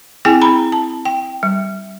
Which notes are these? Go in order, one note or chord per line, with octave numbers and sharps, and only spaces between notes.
C4 E4 G#4 G5 G#5
A#5 B5
A5
G5
G3